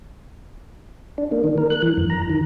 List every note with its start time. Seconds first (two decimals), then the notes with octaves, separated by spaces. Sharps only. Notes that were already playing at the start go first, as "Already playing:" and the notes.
1.18 D4
1.32 A#3
1.44 D#3
1.58 A#4
1.70 F#6
1.82 E3
1.97 F2
2.10 A#5
2.29 D#3